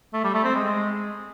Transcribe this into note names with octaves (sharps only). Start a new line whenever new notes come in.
A3
G3
A3
C4
G#3